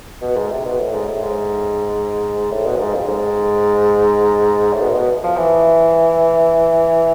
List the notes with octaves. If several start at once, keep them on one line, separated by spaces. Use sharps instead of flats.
B2
G#2
C3
B2
A2
G#2
A2
G#2
A2
B2
F2
G#2
F2
G#2
A2
B2
A2
B2
F3
E3